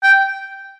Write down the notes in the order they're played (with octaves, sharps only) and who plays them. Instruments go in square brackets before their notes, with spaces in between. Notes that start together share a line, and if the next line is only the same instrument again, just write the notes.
[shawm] G5